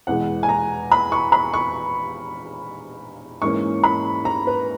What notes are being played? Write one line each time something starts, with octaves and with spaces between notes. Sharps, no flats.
E2 B2 G#3 B3 F#5
G#5
A#5
B5
C#6
B5
C#6
G#2 E3 A#3 C#4 C#6
B5
A#5
B4